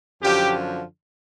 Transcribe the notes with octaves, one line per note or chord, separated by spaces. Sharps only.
F#2 D3 F3 G4